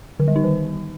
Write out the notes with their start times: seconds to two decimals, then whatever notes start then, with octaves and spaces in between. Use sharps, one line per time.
0.20 D3
0.28 G3
0.36 D#4
0.44 D#3